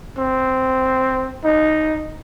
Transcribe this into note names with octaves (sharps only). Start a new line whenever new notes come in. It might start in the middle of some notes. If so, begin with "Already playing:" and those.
C4
D#4